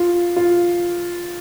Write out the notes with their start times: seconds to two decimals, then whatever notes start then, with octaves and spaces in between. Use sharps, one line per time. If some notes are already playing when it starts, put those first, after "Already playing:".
Already playing: F4
0.36 F4